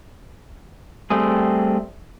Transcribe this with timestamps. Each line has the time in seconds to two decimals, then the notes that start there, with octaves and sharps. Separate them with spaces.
1.10 G3 A3 C4 G#4